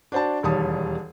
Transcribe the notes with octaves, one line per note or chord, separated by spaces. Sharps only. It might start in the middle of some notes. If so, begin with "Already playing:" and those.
D4 F#4 C5 D5 A5
E1 D#2 G3 C#5 A5 D#6